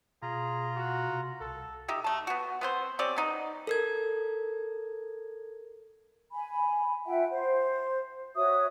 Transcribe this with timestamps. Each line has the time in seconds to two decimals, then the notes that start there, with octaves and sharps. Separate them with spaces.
0.22 B2 F4 G#4 A#5
0.76 F#4
1.07 C3
1.41 C2 A4
1.88 D#4 G4 E5
2.04 A3 A5
2.27 B3 F#4
2.61 B3 C4 C5
2.99 C4 C#4 G4 D5
3.16 B3 D#4
3.67 A4 A#4 G#6
6.32 G#5 B5
7.06 F4 E5 F#5 G5
7.31 C5
8.36 F#4 C#5 E5 D#6